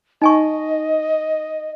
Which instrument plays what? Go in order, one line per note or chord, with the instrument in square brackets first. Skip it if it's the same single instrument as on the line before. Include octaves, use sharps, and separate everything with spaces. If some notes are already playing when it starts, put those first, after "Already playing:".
[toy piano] D#4 G#5 C#6 [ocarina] D#5